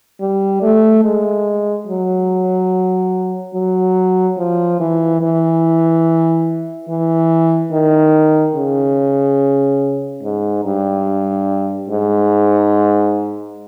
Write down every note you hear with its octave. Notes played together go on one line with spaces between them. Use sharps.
G3
A3
G#3
F#3
F#3
F3
E3
E3
E3
D#3
C#3
G#2
G2
G#2